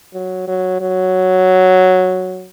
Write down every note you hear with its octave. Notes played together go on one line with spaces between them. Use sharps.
F#3
F#3
F#3